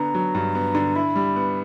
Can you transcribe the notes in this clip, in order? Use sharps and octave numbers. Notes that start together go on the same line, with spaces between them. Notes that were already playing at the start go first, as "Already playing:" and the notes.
Already playing: D3 B3 A#5
F#3
G2
B3
D3
E4 B5
G3
B3